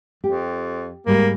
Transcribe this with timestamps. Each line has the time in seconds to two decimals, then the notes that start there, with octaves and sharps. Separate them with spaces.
0.24 F2 G4
1.06 G#2 G3 G#3 A#3